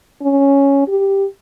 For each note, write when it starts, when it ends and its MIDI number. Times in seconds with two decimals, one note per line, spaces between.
0.22 0.83 61
0.88 1.25 67